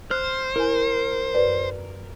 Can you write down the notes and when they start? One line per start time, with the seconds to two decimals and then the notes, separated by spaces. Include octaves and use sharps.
0.11 C5 F6 F#6
0.56 E4 A#4 G#5
1.34 F#2 B4 D5